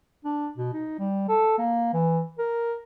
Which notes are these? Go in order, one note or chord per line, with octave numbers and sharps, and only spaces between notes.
D4
B2
D#4
G3
A4
A#3
E3
A#4